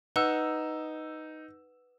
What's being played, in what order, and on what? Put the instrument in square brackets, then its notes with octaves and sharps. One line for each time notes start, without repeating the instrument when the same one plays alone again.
[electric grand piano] D#4 E6 [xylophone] B4 F#5